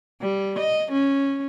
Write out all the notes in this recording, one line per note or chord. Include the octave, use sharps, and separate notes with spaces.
G3
D#5
C#4